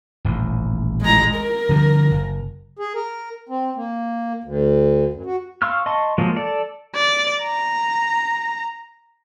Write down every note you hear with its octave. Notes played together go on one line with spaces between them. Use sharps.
D#1 A1 D#2
G#3 A#5
A#4
D3 F3 G3
F#1
G#4
A#4
C4
A#3
D2
F#2
F#4
F5 C6 C#6 E6 F6
D#5 A5 C6 C#6
F3 F#3 G#3 A#3
A4 D5
D5
A#5